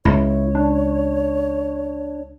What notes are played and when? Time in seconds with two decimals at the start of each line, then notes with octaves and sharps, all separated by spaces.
0.05 C#2 E4 C#5
0.55 D4